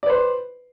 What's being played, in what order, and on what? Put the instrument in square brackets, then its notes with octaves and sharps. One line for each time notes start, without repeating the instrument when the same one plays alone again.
[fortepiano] D5
B4
C5